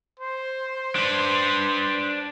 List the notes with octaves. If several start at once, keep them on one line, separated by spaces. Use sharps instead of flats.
C5
D4 B4